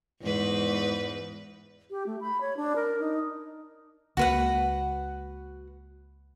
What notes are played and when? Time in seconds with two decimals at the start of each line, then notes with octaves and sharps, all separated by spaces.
0.21 E2 G#2 B4
1.90 G4
2.06 A3
2.21 B5
2.41 C#5
2.57 D4
2.76 A#4
3.00 D#4
4.17 C#2 A#3 F#4 B4 F#5